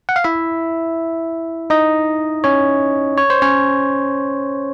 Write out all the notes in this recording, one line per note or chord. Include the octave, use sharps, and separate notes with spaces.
F#5
F5
E4 E5
D#4 D#5
C#4 C#5
C#5
C5
C#4 C#5